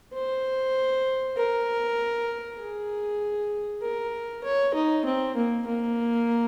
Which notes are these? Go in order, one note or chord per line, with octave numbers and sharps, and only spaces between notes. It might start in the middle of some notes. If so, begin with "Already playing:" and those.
C5
A#4
G#4
A#4
C#5
D#4
C4
A#3
A#3